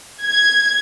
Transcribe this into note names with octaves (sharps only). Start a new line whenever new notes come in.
G#6